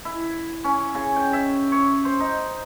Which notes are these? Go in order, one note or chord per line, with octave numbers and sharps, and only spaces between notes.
E4
C#4
C#3
G5
E5
C#5
C5
D#4